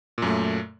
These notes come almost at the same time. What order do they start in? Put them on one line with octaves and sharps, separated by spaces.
A#2 F#2 A3